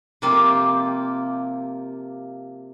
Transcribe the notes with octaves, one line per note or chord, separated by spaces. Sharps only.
C3 F3 A#3 F4 G4